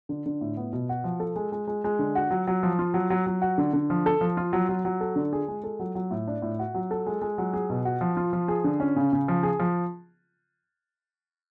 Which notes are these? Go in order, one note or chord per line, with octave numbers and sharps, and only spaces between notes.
D3
D3
A2
B3
B2
F#4
F3
A4
G#3
G#3
G#3
G#3
D3
F#4
F#3
F#3
F3
F4
F#3
F#3
F#3
F#4
D3
D3
F3
A4
F3
F4
F#3
F#3
F#3
A4
D3
G#4
G#3
A4
F#3
F#3
A2
D4
A2
F#4
F#3
A4
G#3
G#3
F#3
G#4
B2
F#4
F3
F4
F3
G#4
D3
C#4
C#3
C#3
F3
G#4
F3